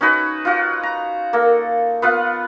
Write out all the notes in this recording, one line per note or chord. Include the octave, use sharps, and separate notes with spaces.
C#4 D#4 F#4 B4
F4 F#4
A#5
A#3 A4
B3 F4 B4 F#5